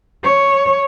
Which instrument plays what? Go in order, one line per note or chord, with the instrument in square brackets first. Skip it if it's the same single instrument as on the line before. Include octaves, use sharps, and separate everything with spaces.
[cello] C#5